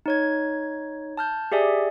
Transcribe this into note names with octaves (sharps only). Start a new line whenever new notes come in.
D#4 C#5 G#6
A5 F6 G6
G4 G#4 D5 E5 G#5